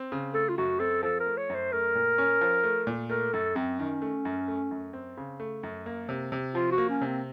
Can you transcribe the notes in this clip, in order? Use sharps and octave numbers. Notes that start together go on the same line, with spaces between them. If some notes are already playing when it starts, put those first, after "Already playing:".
Already playing: C4
C#3
A3 A4
F4
F#2 F#4
C4 A4
F3 A4
A#4
A3
C#5
F#2
C5
A3 A#4
A#2
C#4
F3
A3
A#2
A3 A#4
F#2 A4
F#2 C4
D#3 C#4
A3
F#2
A3
F#2
C4
C#3
A3
F#2
A#3
C3
C3
F3 F4
F#4
A#3
C#4
C3 C4